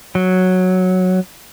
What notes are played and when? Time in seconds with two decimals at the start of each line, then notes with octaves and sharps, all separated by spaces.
0.15 F#3